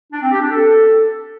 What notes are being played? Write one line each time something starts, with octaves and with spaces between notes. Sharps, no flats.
D4
C4
G4
D4
A4